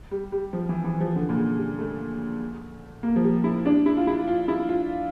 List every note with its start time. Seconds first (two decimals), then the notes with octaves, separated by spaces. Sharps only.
0.11 G3
0.32 G3
0.53 F3
0.69 E3
0.84 E3
1.00 F3
1.16 D3
1.29 A#2
1.37 C#3
1.57 G3
1.78 A3
3.03 A#3
3.16 F3
3.24 G3
3.44 E4
3.66 D4
3.86 E4
3.97 F4
4.07 E4
4.28 F4
4.48 E4
4.69 F4